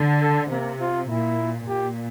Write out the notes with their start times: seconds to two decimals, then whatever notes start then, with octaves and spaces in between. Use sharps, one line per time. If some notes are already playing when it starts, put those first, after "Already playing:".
Already playing: D3
0.22 A4
0.51 C3 A#3
0.80 F4
1.09 A#2 E4
1.67 A#2 G4